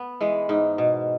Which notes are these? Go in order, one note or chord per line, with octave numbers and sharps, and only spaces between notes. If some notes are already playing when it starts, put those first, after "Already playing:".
Already playing: B3
E3 G#3
G#2 D#4
B2